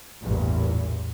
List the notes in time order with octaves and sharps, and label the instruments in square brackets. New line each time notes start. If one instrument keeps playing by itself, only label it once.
[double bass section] A1 E2 G2 A#2